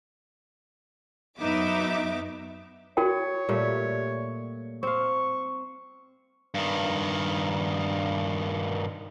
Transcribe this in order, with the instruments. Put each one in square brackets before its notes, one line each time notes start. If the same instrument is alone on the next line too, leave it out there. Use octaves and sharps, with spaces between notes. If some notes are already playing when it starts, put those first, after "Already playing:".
[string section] F#2 F#3 B3 D#4 E5 D6
[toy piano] F#4 A#4 G5 [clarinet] C#5
[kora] A#2 G3 A3
[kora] C4 F5 [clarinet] C#6
[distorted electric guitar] G2 D#3